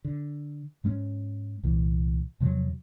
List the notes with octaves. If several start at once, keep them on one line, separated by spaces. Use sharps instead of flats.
D3
G#2 G#3 A3 C#4
C2 A#2 E3
E2 C3 F3 F#3